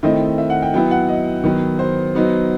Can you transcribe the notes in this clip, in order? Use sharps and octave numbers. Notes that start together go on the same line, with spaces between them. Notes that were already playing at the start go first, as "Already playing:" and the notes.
D#3 A3 C4 E4 D#5
E5
F#5
G5
F#3 B3 E4 G5
F#5
D#5
D#3 F#3 B3
C5
F#3 B3 D#4